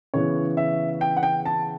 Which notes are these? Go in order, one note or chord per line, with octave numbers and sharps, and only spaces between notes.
C#3 E3 B3 C#5
E5
G5
F#5
G5
A5